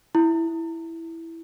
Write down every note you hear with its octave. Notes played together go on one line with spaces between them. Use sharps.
E4